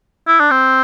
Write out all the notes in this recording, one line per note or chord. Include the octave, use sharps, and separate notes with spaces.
E4
D4
C4